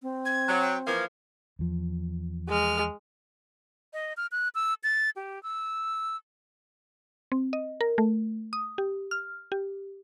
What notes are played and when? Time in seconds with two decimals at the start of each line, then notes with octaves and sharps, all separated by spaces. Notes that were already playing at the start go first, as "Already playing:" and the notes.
0.02 C4
0.25 G#6
0.49 F#3
0.62 G5
0.87 E3 F3 A#3 G#6
1.59 E2 F3
2.49 G#3 F6
3.93 D#5
4.17 F6
4.32 F#6
4.55 E6
4.84 A6
5.16 G4
5.43 E6
7.32 C4
7.53 D#5
7.81 A#4
7.98 A3
8.53 D#6
8.78 G4
9.11 F6
9.52 G4